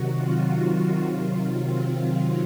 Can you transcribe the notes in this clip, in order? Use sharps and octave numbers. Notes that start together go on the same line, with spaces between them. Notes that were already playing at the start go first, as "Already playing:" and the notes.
Already playing: C3 D#3 F#3 F#4
F4
C3 D#3 F#3 F4
C4